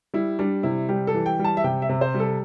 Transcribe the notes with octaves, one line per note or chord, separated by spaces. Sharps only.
G3 E4
G3 D4
C3 E4
G3 G4
A4
E3
G5
G3
A5
E5
C3 G5
E5
C3
C5
G3
A4